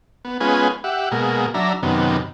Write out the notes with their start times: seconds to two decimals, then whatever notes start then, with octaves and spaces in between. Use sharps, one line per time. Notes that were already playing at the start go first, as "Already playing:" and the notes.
0.25 B3
0.40 G#3 B3 C#4 F4 B4 G#5
0.84 G4 E5 F#5
1.11 B2 G#3 A#3
1.54 F#3 D4 E5 A#5
1.83 F#2 C3 D#3 B3